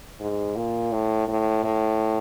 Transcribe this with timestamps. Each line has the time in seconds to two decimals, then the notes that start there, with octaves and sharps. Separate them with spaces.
0.20 G#2
0.56 A#2
0.92 A2
1.28 A2
1.64 A2